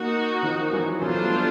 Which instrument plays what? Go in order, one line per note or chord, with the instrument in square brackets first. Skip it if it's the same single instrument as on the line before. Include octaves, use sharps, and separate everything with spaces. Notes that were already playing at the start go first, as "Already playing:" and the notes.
Already playing: [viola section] A#3 D#4 F#4
[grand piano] D#3 F3
E3 F#3
[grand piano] E3 F#3 [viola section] B3 D4 F4 A4 C5
[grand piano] G3 A3